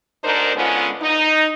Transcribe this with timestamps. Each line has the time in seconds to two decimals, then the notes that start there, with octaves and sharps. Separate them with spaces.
0.24 D2 G#2 D4 D#4 A#4 C5
0.56 G#2 D3 G#3 B3 C#4 F4
1.02 D#4